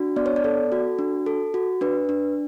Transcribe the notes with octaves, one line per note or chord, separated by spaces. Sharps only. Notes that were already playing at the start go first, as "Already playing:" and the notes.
Already playing: D4 F#4
B3 D5
C#5
D5
A4
F#4
D4
A4
F#4
D4 B4
D4